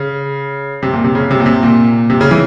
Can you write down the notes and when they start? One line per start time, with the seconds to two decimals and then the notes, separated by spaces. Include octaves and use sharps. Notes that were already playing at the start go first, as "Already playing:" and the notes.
Already playing: C#3
0.83 C3
0.93 A#2
1.04 C3
1.15 C#3
1.31 C3
1.40 A#2
1.46 C3
1.63 A#2
2.10 C3
2.21 C#3
2.31 E3